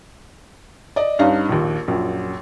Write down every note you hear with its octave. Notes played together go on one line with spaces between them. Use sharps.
D5 D#5
G2 C#4 D#4 F5
A#1 D#2
A#1 F#2